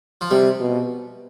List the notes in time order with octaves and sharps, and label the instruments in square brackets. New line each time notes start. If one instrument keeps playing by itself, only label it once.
[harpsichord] F3
[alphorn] C3 [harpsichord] G3
[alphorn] B2